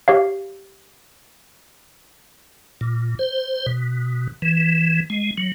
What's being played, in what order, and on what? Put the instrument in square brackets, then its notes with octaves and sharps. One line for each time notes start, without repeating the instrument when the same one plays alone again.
[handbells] G4 C#5 F5
[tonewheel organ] A#2
C5
B2
E3
G#3
F#3